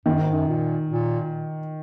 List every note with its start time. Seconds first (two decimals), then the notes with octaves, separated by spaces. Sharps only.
0.06 F#2 D#3
0.20 G#2
0.33 F#2
0.48 A#2
0.90 A#2